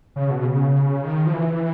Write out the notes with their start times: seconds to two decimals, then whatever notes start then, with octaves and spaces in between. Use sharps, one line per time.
0.16 C#3
0.30 B2
0.45 C#3
1.04 D#3
1.26 F3
1.34 E3